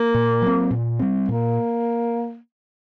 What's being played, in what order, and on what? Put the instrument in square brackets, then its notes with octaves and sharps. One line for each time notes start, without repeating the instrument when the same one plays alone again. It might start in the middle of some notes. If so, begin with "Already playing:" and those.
Already playing: [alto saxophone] A#3
[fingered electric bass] A#2
F#3 C4
A#2
G3 C4
[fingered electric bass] A#2 [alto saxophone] A#3